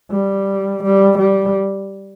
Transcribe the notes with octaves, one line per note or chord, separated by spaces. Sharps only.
G3
G3
G3